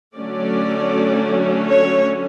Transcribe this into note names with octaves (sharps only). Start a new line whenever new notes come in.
D3 F#3 A3 C#4 D5
C#5